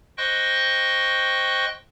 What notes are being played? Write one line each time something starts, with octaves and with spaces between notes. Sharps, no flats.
C5 D#5 G5 C6 C#6 F#6